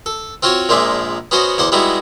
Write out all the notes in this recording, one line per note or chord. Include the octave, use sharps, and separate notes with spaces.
A4
C4 F4 F#4 C#5 F#5
A#1 A#2 F3 G#3 D5 E5
B3 C#4 F#4 C5 D#5
E2 C5 F#5 D6
G3 G#3 B3 D#4 E4 F#4